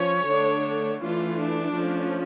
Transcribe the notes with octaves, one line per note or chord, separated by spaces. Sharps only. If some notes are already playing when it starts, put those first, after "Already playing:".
Already playing: F3 C#4 C#5
D3 A3 D4
E3 A3 D4 F4
D4
F3 A3 C#4